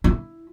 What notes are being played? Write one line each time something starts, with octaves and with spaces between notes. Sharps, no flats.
E4